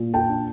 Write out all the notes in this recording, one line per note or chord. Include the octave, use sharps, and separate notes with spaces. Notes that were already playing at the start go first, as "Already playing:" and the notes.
Already playing: A#2
G5 A5
D4